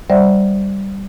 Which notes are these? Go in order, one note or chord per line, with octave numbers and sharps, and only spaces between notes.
G3 C5 D5 E5 F#5